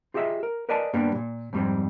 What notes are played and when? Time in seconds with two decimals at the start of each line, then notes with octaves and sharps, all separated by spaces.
0.14 F4 G4 G#4 D#5 E5
0.43 A#4
0.69 A#4 B4 D5 D#5 G#5 A5
0.93 G2 G3 A#3 B3 D4
1.15 A#2
1.53 F2 G#2 G3 C4